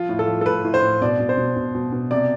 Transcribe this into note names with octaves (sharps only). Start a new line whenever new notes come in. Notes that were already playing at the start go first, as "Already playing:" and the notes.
Already playing: F3 F4
A2
A4
F3
A4
A2 B4
A2
C5
A2
B2 D5
B2
C5
B2
B2
B2
B2
C3 D5